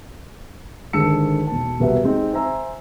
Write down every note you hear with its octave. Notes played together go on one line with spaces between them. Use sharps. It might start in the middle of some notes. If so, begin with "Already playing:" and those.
G#1 D3 G#3 A5 E6 C#7
E1 A5
E1 C2 B3 F#4 E5
G#3 C4 D#4
C5 E5 G#5 A#5 E6